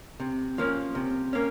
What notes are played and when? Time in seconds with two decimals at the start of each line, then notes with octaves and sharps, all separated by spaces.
0.20 C3
0.58 F3 A#3 C#4
0.95 C3
1.33 A#3 C#4